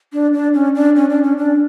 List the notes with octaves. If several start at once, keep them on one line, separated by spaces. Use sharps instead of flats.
D4
D4
C#4
D4
C#4
D4
C#4
D4